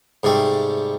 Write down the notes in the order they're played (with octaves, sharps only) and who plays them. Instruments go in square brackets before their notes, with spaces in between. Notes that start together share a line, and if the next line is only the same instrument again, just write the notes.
[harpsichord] G#2 C3 G3 A3